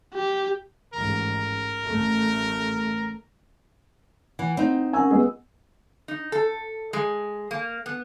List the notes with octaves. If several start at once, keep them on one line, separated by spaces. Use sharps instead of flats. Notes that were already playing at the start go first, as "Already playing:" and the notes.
G4
A1 G#2 A#4
A1 A3
E3 F#5
C4 D#4
C#4 A#4 F#5 G#5 E6
G#3 B3 G#4 E6
D#4
A4
G#3
A#3
B3